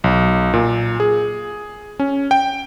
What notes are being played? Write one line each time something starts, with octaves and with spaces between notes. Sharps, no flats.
B1
A#2
G#4
C#4
G5